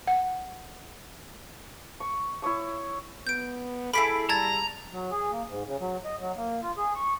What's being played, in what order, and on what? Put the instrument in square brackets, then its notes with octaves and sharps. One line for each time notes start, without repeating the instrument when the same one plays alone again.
[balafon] F#5
[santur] C#6
E4 C#5 C#6 D#6
[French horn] B3 [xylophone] G6 D7
[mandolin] E4 G#4 D6 [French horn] A4 [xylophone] B5 B6
[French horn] G3 [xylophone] A5 G#6 A6 [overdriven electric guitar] A#5
[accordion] F#3
G#4
A#3
G#2
C#3
F#3
D#5
F#3
A#3
F4
G#4
C#6